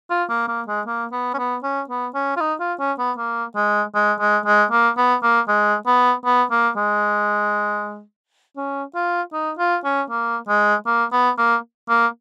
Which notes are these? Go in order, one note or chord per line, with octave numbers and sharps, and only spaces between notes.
F4
A#3
A#3
G#3
A#3
B3
C#4
B3
C#4
B3
C#4
F4
D#4
F4
C#4
B3
A#3
G#3
G#3
G#3
G#3
A#3
B3
A#3
G#3
B3
B3
A#3
G#3
C#4
F4
D#4
F4
C#4
A#3
G#3
A#3
B3
A#3
A#3